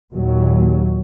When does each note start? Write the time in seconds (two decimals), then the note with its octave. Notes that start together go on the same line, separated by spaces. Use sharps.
0.13 D#2 A#2 F#3